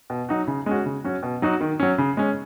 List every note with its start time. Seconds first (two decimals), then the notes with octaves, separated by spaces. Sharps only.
0.10 B2
0.29 F#3 D#4 F#4
0.47 C#3
0.66 G#3 C#4 F#4
0.86 C#3
1.04 F#3 C#4 F#4
1.23 B2
1.42 F#3 D#4 F#4
1.61 D#3
1.80 F#3 C#4
1.98 C#3
2.17 G#3 C#4